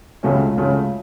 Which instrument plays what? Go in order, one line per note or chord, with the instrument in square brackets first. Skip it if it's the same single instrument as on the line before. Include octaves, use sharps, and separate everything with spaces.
[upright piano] C#2 C#3 F#3 A3 C#4
C#2 C#3 F#3 A3 C#4